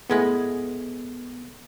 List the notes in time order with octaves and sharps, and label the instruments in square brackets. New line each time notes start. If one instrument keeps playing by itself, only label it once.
[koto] A2 G#3 B4 [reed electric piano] B3